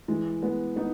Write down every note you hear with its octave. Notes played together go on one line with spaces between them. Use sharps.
E3 G#3
G#3 B3
B3 D#4